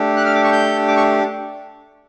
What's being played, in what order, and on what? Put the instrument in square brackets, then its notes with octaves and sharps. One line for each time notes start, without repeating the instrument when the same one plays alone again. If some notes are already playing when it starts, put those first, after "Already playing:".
Already playing: [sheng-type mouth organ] A3 D4 G4
F#6
F6
D6
C#6
G6
D6
C#6